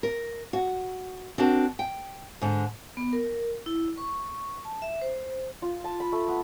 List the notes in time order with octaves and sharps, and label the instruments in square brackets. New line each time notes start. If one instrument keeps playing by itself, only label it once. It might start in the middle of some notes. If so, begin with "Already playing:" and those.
[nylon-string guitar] A#4
F#4
C4 D4 F#4 A#4
G5
G#2 D3
[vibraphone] B3
A#4
E4
C#6
A5
E5
C5
[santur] F4
A5
B5
A3
B3